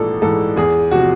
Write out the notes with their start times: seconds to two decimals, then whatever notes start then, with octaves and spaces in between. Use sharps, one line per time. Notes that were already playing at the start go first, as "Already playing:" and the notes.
Already playing: A#1 G#2 E3 A4
0.22 G#2 E3 A4
0.56 E2 G#4
0.91 C3 F3 F#4